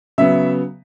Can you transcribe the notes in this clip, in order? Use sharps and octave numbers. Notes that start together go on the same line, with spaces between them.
C#3 F#3 B3 E5